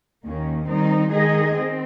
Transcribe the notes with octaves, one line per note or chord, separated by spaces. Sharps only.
D#2 D#3 A#3 C#4
D#3 G3 C4 D#4
D#3 G#3 D#4 G#4 D#5
C4